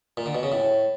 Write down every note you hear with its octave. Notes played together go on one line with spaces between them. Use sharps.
A#2
D3
B2
C#3
A2